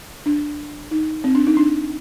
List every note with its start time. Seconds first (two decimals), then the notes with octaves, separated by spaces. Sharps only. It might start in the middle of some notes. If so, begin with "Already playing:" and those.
0.26 D4
0.91 D#4
1.24 C4
1.35 D4
1.47 D#4
1.57 D4